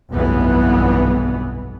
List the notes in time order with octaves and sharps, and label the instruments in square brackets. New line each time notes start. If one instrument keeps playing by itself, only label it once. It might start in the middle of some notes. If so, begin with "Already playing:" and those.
[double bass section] F1 B1 G2 E3 B3